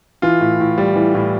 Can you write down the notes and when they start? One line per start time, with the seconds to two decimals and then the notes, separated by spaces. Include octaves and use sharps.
0.22 E3 F4
0.40 A2
0.60 A2
0.78 G3
0.96 E3
1.14 A2